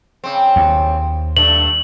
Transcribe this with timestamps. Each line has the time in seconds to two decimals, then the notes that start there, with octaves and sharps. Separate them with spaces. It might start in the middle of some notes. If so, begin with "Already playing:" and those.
0.24 C#3 C4
0.56 D#2
1.37 G2 A3 D4 F#7